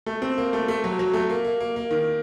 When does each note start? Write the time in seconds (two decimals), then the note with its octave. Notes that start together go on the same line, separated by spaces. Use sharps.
0.06 A3
0.22 C4
0.38 A#3
0.53 A3
0.68 A3
0.84 F#3
0.99 F#3
1.14 A3
1.30 A#3
1.44 A#3
1.60 A#3
1.76 A#3
1.91 D#3